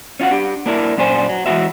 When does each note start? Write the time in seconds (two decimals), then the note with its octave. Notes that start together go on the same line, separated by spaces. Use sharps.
0.20 C#4 F4 F#4 F#5
0.31 D4 G4
0.66 A#3 D4 E4 A#4
0.97 F#2 A#2 D4 C5 G#5
1.29 F#3
1.46 E3 G#3 A#3 E4 F#4 E5